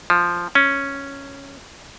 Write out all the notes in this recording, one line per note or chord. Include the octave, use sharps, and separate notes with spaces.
F3
C#4